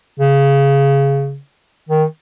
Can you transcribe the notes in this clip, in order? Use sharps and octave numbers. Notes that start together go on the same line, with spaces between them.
C#3
D#3